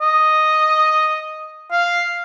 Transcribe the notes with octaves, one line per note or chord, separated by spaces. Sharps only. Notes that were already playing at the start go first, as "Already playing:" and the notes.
D#5
F5